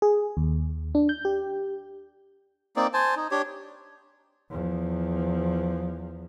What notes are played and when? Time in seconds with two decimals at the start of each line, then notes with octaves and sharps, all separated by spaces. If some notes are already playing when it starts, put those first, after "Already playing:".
0.02 G#4
0.37 D#2
0.95 D4
1.09 G6
1.25 G4
2.76 A#3 C4 D#4 D5
2.93 C5 G#5 A5
3.17 D#4
3.31 D4 G4 C#5
4.50 E2 F3